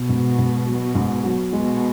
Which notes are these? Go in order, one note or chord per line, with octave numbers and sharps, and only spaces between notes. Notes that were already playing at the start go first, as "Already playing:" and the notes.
Already playing: B2
G#2
G#2
F#3
G#2
F#3
B2 G#3